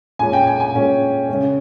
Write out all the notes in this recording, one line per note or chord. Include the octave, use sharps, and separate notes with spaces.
A#2 G#3 C#4 G#5
G5
G#5
G#5
A#2 G#3 C#4
C#3 G#3 C#4